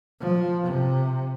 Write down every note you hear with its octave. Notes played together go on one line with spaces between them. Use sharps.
F3
C3